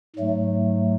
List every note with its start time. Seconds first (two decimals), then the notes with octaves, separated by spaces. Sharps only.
0.16 G#2 F#3 A3